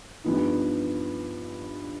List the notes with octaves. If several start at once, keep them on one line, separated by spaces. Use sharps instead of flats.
G2 F3 B3 D#4